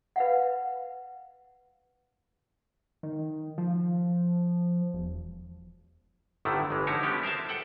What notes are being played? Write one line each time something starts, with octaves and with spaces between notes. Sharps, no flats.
B4 F5 F#5
D#3
F3
E1
G1 A2 D3 D#3 A3 E4
G1 E3 G#3
D3 F3 D#4 E4 C#5
G3 G#3 B3 C#4 G4
A#4 C5 E5 A5
A4 F#5 G5